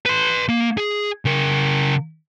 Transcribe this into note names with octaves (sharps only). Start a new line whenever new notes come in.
B4 C6
A#3
G#4
C#3 A#4